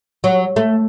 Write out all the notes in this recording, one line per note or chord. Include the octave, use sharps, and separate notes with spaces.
F#3
A3